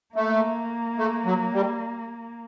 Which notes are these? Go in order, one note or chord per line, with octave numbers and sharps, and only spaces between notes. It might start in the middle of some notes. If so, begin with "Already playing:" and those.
A3 A#3
A3
F#3
G3